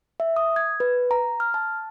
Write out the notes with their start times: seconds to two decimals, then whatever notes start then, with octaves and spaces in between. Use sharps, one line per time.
0.20 E5
0.36 D#6
0.56 G#6
0.80 B4
1.11 A#5
1.40 F6
1.54 A5